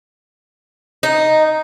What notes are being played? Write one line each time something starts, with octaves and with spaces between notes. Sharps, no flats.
D#4